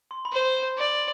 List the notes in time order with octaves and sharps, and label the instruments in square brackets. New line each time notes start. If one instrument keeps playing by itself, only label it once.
[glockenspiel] C6
B5
[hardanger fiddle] C5 [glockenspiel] C6
[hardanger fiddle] D5